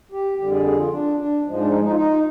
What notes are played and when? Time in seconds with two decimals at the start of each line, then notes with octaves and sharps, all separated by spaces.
0.12 G4
0.38 F2 D3 G3 G4
0.51 G#4
0.65 G#4
0.77 F4
0.91 D4
1.17 D4
1.43 G#2 F3 G#3
1.57 D4
1.70 D#4
1.83 D#4
1.90 F4
1.96 D#4